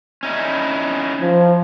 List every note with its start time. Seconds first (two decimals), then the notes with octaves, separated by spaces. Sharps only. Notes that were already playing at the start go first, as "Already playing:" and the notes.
0.23 C#4 D#4 E4
1.21 F3